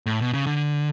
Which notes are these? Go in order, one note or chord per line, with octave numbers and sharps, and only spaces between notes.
A2
B2
C#3
D3